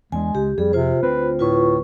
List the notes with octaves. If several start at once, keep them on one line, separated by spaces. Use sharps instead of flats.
E2 G#3 C#4 D4 G#5
C#2 G4
F2 G3 G#4
C3 F4 C5
D2 C4 B4
A2 F4 B4 C#6